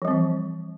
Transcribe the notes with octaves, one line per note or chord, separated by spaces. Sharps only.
E3 F3 G3 C4